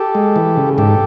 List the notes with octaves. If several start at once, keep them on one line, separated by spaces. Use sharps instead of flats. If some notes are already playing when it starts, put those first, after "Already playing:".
Already playing: G4 A4
G#3
E3
C#3
G#2 G4 A4